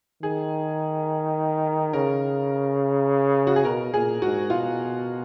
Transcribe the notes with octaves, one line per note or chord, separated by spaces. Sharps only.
D#3 G#4
C#3 A#4
F#4
G#4
B2 A#4
A#2 G#4
G#2 F#4
B2 F4